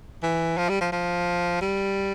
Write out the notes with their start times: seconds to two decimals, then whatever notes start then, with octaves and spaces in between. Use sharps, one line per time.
0.23 E3
0.58 F3
0.69 G3
0.81 F3
0.92 F3
1.62 G3